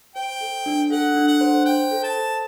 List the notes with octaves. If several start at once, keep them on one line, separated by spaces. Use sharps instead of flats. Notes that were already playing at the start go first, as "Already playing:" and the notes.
C5 G5
A4
D4
A4 F#5
D4
F#5
C5
C5 G5
A4
A5
A4